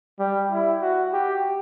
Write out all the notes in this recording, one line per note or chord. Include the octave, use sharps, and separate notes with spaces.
G3
E4
F#4
G4